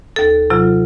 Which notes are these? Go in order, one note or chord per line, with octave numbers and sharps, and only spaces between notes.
D#2 A4
C3 F#3 F4